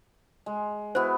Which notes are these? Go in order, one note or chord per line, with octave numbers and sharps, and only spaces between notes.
G#3
B3 E4 F#4 C5